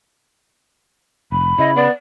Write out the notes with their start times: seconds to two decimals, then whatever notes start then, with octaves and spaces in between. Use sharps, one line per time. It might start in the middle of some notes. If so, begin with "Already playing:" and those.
1.32 F1 B5
1.59 C#3 E4 D#5
1.76 B3 D5